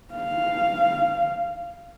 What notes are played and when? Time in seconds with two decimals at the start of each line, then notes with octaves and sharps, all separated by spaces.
0.14 F5